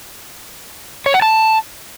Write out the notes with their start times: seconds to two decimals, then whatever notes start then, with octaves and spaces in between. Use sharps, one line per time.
1.06 C#5
1.14 F#5
1.22 A5